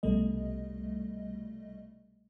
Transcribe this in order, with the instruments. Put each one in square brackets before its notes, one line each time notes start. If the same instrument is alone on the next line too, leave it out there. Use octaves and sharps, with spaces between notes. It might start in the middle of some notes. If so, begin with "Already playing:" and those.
[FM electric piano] C2 B2 G3 A3 D#5